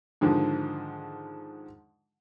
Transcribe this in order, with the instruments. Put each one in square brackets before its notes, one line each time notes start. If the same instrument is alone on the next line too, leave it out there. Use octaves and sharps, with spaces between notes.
[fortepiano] G#2 D3 D#3 F3